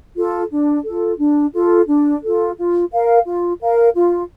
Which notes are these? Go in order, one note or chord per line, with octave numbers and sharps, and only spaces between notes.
F4 A4
D4
F4 A4
D4
F4 A4
D4
F4 A4
F4
A#4 F5
F4
A#4 F5
F4